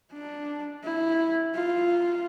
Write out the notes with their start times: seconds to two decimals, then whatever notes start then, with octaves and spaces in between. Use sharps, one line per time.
0.12 D4
0.84 E4
1.55 F4